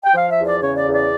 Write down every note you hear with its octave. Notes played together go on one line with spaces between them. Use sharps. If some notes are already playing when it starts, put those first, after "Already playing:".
G5
F3 F5
E5
E2
D5
C#3 C#5
D5
E2
D5